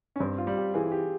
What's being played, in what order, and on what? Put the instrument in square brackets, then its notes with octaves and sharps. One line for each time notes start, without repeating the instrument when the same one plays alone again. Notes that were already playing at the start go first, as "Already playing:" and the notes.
[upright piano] C#4
[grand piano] G2 [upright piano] C4
[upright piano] F4
[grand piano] G3
[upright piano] G4
[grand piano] E3 [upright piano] G#4
[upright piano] G4